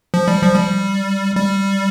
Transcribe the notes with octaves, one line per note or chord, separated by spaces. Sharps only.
F3
G3
F3
G3
G3